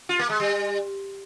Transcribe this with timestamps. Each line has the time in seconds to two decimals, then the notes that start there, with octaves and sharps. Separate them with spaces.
0.09 F4
0.19 A#3
0.30 G#3
0.40 G3